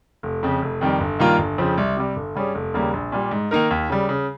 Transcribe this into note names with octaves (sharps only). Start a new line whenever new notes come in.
F1
F2 C#3
F1
F2 D#3 G3
G1
G2 D#3 A#3 F4
G1
F2 C#3 F3 C4
C2
C3 G3
G1
G2 G3 C#4 G#4
F1
D#2 C#3 G3 A#3
A#1
A#2 G3
G#2
D#3 A#3 D#4 A#4
D#2
C#3 G3
C#3